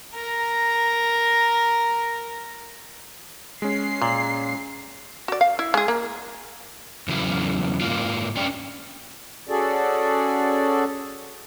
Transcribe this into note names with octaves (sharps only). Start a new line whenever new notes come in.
A#4 A#5
G#3 C#4 C7
A#2
F#4 D5
F5
E4
G#3 G#4
A#3
E2 C#3 F#3 E4
G#2 D#3 A#3 F4
C#4 D4 D5 G5
C#4 F#4 G#4 A4 D5